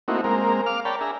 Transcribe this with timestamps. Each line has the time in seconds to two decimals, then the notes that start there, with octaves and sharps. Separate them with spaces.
0.08 A3 A#3 C4 D#4 E4 F#4
0.24 G#3 A#3 C4 A#4
0.66 F5 D6 F6
0.85 A#4 C#5 D5 G5 A5 B5
1.01 D4 G#4 E5 A#5